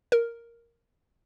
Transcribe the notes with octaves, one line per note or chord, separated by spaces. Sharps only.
A#4